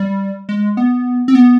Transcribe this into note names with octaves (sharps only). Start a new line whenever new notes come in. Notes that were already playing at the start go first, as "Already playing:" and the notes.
Already playing: G3
G#3
B3
C4
B3